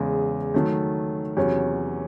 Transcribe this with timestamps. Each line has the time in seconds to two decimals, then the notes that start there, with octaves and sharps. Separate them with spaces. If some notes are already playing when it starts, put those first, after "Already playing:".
Already playing: E2 C#3 G#3
0.54 D#3 F#3 A3
1.37 E2 C3 F#3 C#4